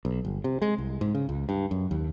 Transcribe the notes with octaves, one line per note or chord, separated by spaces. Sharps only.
B1
G1
C3
G#3
C2
G#2
C#3
C#2
G2
F#2
D#2